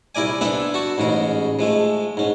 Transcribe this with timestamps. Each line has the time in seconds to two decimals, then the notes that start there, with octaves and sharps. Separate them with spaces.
0.15 C2 E4 A#4 D5 G#5
0.41 B3 C4 D4 A4 E5
0.74 F#4 A5 C#6
0.98 A1 G#2 C#3 A#4
1.59 F3 G#3 A3
2.17 G#2 C#4